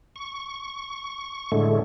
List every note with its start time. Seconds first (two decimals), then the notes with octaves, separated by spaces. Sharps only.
0.16 C#6
1.52 A2 D3 G#3 A3